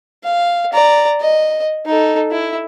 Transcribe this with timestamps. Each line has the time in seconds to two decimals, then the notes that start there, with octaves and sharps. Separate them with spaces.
0.24 F5
0.73 D5 A#5
1.20 D#5
1.86 D#4 A4
2.31 E4